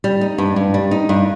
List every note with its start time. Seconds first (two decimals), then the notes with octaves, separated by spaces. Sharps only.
0.04 G3
0.21 D#4
0.38 G2
0.56 G2
0.74 G3
0.91 D#4
1.09 G2